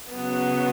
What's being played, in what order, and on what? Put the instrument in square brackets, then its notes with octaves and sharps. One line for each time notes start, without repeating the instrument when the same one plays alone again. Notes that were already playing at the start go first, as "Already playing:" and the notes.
[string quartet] C#3 F#3 B3